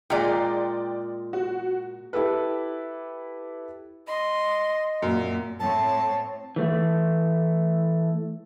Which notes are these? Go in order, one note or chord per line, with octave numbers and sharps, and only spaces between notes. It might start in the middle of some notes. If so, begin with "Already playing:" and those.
A#2 G#3 D5 G5
F#4
E4 G4 A4 B4
D#5 C6
F#2 A#2
A2 C4 C#5 A5
E3 A3